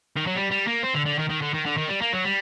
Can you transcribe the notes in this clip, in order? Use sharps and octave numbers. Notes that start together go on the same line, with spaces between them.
D#3
F#3
G3
G3
A#3
C4
D3
D3
D#3
D#3
D3
D#3
D3
D#3
G3
A#3
F#3
G3